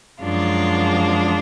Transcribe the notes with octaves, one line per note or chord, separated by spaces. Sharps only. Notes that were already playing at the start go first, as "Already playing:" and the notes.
F#2 F3 G#3 D4 F4